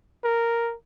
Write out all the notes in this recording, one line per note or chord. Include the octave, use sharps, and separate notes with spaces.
A#4